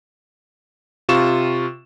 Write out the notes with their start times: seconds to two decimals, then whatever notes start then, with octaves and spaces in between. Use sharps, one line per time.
1.09 C3 F4 C#6 E7